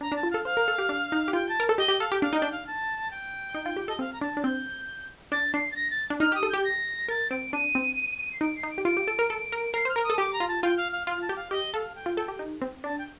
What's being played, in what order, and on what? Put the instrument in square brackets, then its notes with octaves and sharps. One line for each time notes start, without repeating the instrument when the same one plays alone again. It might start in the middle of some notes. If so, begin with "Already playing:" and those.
[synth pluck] D4 [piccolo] A#5
[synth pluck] D4 [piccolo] A5
[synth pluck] F4
[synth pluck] A4 [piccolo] F5
[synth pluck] C5 [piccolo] F5
[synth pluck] A#4
A4
G4
D4
D#4
G4
[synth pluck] F4 [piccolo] G5
[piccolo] A5
[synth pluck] A#4
A4
[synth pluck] G4 [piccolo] D#5
[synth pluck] G4
[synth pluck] A4 [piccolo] F5
[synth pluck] G4 [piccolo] G5
[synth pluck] D4 [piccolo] F5
[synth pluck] D#4 [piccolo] G5
[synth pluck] D4
[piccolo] F5
A5
G5
[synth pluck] D#4
F4
G4
[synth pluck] A4 [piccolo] D#5
[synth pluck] C4 [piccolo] F5
[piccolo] A#5
[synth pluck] D4 [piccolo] A5
[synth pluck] D4
[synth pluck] C4 [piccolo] G6
[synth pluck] D4 [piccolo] A6
[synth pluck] D4 [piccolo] C7
[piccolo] A6
A#6
A6
[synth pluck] D4
[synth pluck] D#4 [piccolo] F6
[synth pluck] G4 [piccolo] D#6
[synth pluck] A4
[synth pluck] G4 [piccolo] G6
[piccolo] A#6
[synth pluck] A#4 [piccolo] A6
[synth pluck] C4 [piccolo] D7
[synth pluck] D4 [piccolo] D#7
[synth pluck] C4
[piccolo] C7
[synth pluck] D#4 [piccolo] D7
[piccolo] C7
[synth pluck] D#4
[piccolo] D7
[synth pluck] G4
[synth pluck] F4 [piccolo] D7
[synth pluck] G4
A4
A#4
A4
A#4
[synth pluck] A#4 [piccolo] C7
[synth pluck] C5 [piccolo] F6
[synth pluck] A#4
[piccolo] D#6
[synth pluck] A4
[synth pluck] G4 [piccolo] D6
[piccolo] A#5
[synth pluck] F4
[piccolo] A5
[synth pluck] F4 [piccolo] G5
[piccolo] F5
F5
[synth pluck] F4 [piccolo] F5
[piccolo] A5
[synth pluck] G4
[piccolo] F5
[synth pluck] G4 [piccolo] D#5
[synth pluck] A4 [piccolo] F5
[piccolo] G5
[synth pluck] F4
[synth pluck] A4 [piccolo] G5
[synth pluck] G4
D#4
C4
[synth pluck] D4 [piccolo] A5
[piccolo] G5